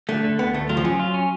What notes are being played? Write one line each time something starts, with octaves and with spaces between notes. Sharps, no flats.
D3 A3
D3
D2 B3
D2 A3
F#3 F4
F3
F#3 C#4
F4
C#4